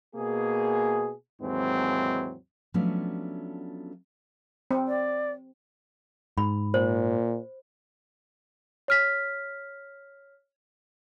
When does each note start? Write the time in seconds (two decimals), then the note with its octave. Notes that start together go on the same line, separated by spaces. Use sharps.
0.15 B2 A#3 G#4
1.41 D#2 G#2 E3 F#3 C4
2.74 F3 F#3 A3 B3 C#4 D4
4.71 C4
4.87 D5
6.38 G#2 B5
6.74 A#2 C5
8.88 C#5 F6 B6